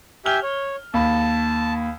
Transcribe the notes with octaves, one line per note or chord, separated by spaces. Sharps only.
G4 E5 G#5 F6 G7
C#5
D#2 A5 B5